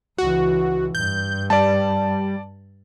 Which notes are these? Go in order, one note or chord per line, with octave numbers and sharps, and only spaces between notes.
C#2 E3 F#4
G2 G6
G3 D5 A5